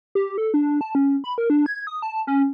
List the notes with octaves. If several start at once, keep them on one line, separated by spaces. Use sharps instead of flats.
G4
A4
D4
A5
C#4
B5
A#4
D4
G#6
D#6
A5
C#4